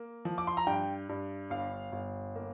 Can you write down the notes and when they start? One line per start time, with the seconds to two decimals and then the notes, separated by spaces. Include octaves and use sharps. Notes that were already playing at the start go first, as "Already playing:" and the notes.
Already playing: A#3
0.25 F3
0.38 D6
0.47 C6
0.57 A#5
0.67 G2 G5
1.09 G2
1.50 G1 F5
1.92 G1
2.35 A#3